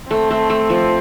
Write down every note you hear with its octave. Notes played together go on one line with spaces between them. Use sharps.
A3 C4
A3
A3
F3